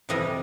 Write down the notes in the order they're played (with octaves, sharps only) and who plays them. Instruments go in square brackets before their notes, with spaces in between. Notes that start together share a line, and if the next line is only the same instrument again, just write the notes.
[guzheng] F2 C3 E3 G3 D#5